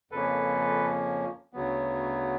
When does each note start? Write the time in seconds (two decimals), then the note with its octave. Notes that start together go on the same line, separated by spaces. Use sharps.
0.11 F2 C#3 F3 A#3 C#4 A4 B4
1.53 D2 C#3 F#3 B3